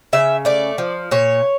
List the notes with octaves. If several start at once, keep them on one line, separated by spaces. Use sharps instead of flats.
C#3 E5
A3 D5
F3
A#2 C#5